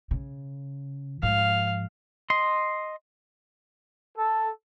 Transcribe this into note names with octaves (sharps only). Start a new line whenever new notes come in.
C#3
G#2 F3 F5
D#5 C6
A4